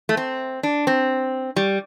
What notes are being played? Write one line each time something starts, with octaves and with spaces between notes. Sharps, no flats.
A3
C4
D4
C4
G3